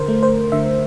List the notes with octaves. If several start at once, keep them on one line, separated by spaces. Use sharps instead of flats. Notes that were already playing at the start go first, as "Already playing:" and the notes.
Already playing: D3 A#4 C5
A3
C5
D3 E5